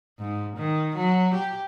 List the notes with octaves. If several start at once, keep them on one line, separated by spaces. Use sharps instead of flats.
G#2
D#3
F#3
G4